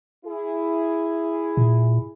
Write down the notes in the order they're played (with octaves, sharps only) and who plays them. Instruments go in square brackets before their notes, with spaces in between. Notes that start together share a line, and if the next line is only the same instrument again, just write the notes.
[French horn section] E4 G#4
[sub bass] A#2